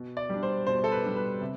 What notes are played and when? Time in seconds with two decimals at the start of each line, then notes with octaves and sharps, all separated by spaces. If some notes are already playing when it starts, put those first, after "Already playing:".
Already playing: B2
0.17 D5
0.29 G3 D4
0.43 C5
0.67 B2 C5
0.84 A4
0.92 B4
1.03 G3 D4
1.16 B4
1.41 C3